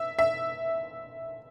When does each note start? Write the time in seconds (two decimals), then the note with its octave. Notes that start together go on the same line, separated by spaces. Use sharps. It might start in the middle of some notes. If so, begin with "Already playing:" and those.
Already playing: E5
0.19 E5